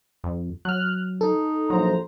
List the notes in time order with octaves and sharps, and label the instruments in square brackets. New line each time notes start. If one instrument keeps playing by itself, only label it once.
[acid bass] F2
[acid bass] F#3 [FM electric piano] F6 F#6
[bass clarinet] D#4 [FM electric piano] A4
[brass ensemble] A#1 C5 A#5 [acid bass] F#3